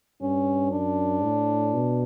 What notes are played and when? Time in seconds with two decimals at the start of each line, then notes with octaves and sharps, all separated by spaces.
0.21 G2 C#4
0.72 F#2 D4
1.23 A2
1.74 B2